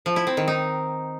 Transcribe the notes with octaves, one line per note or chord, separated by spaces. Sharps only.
F3
E4
C4
D#3
D#4